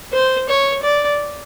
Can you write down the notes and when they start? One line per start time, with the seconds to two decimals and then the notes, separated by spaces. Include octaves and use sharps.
0.13 C5
0.49 C#5
0.83 D5